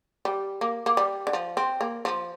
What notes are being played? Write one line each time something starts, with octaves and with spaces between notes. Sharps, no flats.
G3
A#3
A#3
G3
D3
F3
C4
A#3
F3